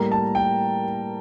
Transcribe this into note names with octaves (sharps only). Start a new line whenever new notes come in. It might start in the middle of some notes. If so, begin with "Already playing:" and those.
Already playing: A2 G3 A#3 A#5
A5
G5